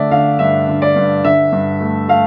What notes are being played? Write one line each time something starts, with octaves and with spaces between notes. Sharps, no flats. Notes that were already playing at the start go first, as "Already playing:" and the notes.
Already playing: D3 A3 D5 E5
D3 F5
G2 E5
D3
D5
G2
D3 E5
G2
A3
A3 F5